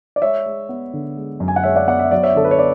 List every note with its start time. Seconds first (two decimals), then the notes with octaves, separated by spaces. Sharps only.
0.16 D5
0.22 G#3 C#5 E5
0.46 G#3
0.69 B3
0.93 D3
1.17 G#3
1.40 F#2
1.48 G#5
1.56 F#5
1.64 G#3 C#5 E5
1.76 D5 F#5
1.87 B3 D5 F#5
1.99 E5
2.11 F#3 D5
2.23 C#5 E5
2.35 D3 A4
2.45 B4
2.51 C#5
2.58 B3 D5